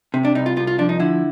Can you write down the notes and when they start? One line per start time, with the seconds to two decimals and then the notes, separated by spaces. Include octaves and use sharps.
0.14 C3
0.25 D4
0.35 C2 D#4
0.46 F4
0.57 C2 F4
0.67 F4
0.79 F3 D4
0.89 D#4
1.00 D3 E4